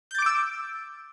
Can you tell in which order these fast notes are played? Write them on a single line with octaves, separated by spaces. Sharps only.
G6 A6 D6 D7 E6